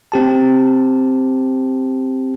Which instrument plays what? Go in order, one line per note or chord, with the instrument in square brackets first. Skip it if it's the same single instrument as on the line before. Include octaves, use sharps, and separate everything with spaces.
[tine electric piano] C4 G4 A5